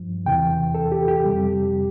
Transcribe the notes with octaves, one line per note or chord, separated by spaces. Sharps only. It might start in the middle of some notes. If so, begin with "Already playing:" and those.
Already playing: G2 F3
E2 C3 E3 G5
A4
G4
G4
F2 C3 G3